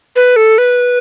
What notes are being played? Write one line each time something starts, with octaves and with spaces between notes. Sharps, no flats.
B4
A4
B4